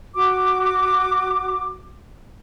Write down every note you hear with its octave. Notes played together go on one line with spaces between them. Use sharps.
F#4 D6